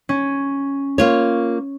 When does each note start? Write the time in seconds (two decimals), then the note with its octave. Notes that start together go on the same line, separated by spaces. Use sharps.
0.09 C#4
0.98 A#3 F4 C#5